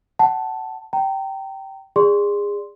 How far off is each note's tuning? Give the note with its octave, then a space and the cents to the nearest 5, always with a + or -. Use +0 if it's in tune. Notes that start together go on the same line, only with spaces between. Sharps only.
F#5 +25 A5 +0
G5 -15 A#5 -25
G#4 -25 D5 +0 C6 +0